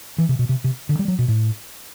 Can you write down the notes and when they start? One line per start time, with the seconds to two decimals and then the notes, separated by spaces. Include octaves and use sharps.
0.18 E3
0.29 C3
0.39 B2
0.49 C3
0.64 C3
0.89 D3
0.99 G3
1.08 F#3
1.19 B2
1.28 A2